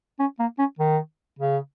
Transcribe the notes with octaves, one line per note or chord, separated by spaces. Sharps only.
C#4
A#3
C#4
D#3
C#3